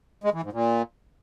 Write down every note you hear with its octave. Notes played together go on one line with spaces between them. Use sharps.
G#3
E3
G#2
A#2